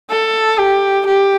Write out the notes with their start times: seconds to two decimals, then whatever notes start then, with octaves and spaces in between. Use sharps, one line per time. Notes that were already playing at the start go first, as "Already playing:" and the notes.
0.10 A4
0.58 G4
1.07 G4